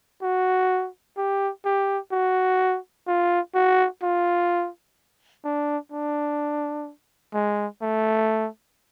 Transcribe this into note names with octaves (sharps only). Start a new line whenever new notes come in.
F#4
G4
G4
F#4
F4
F#4
F4
D4
D4
G#3
A3